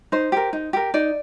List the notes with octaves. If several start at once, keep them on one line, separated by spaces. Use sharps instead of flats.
D#4 C5
G4 A#4
D#4
G4 A#4
D#4 D5